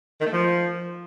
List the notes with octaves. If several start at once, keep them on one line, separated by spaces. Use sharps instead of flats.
D#3
A3
F3